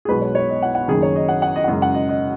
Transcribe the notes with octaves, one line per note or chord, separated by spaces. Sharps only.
G#4
B1 B2 G#3 B4
C#5
C#5
D#5
F#5
F#5
F#1 F#2 D#3 G#4
C#5
D#5
F#5
F#5
D#5
F#5
F#2 C#3 G#3 D#5
F#5
D#5
D#5